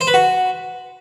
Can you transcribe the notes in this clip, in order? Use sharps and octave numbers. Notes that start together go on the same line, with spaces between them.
C5
B4
F#4